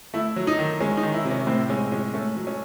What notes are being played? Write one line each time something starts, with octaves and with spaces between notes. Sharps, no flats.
A3 E4
F#3
D#4
D#3
G#3 C#4
D#4
D#3
E4
C3
C#4
A2 C4
G#3 C#4
G#3 C#4
A3 C#4
F#3
C#4